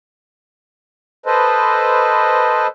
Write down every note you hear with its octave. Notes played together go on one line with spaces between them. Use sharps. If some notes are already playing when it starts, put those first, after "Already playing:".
A4 B4 C5 D#5